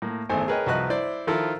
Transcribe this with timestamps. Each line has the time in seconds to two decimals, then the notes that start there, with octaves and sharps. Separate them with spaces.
0.02 A2 A#3
0.29 G#1 E2 A3 C5 G#5
0.48 G#4 A#4 B4 C#5 D#5 G5
0.66 C2 F3 F#4 B4 D#5 F#6
0.90 E4 C5 D5
1.27 D#3 F3 E4 F4 A4 A#4